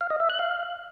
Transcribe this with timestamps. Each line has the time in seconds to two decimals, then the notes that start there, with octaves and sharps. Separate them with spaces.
0.01 F5
0.10 D#5
0.20 E5
0.30 F#6
0.39 F5